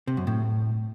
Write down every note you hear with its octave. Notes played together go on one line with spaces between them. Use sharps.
C3
F#2
A2